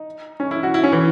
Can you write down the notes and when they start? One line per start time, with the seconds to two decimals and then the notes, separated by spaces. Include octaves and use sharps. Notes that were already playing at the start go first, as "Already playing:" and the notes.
Already playing: D#4
0.40 C#4
0.51 E4
0.63 F#4
0.74 E4
0.83 C#4
0.92 E3